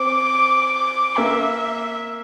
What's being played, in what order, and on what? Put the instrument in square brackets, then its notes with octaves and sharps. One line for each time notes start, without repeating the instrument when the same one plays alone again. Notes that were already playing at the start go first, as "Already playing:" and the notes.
Already playing: [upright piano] C4 [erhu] D6
[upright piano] A#3 [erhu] E5